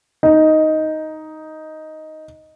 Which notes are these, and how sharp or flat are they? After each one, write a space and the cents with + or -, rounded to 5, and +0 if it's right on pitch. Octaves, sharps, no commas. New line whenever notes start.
D#4 +5